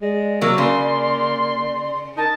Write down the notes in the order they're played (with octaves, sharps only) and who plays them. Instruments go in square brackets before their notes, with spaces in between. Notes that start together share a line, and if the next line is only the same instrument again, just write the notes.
[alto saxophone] G#3 [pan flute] D5
[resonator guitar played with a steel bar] C3 F#3 [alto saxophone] A#3 [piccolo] E6
[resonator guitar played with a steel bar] C#3 [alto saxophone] A#3 [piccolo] C6
[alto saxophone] D#4 [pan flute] A#4 [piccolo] A5